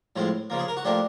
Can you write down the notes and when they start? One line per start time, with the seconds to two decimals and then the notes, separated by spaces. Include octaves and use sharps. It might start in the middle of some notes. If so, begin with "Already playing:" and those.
0.16 A2 F3 G#3 C4
0.50 C#3 F3 A#3
0.59 G#4
0.68 A#4
0.77 F#4
0.85 A2 F3 A#3 D4 G4